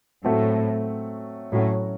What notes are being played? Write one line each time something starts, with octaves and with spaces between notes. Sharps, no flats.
A2 F#3 A3 C4 F#4 A4
A2 F#3 C#4 F#4